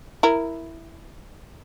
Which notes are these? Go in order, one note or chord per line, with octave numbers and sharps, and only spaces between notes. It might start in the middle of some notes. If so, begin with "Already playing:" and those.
E4 A#4